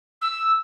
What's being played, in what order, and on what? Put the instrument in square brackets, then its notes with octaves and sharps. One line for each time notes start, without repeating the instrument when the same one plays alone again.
[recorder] E6